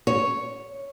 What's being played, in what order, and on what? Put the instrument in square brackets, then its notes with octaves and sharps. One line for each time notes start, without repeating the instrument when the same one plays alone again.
[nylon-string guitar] C#5